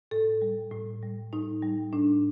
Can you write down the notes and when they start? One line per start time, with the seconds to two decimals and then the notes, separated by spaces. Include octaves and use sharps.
0.11 A2 A4
0.42 G3
0.71 A2
1.03 G3
1.33 A2 D#4
1.62 G3
1.93 A2 D4